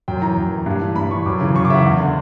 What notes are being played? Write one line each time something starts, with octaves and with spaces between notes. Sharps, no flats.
F#2 G5
E3 A#5
F#2
E3
G2
E3
G2 B5
E3 C#6
F#2 D6
C#3 E3
F#2 C#6
D6
C#3 E3 E5 F#5
E2
D3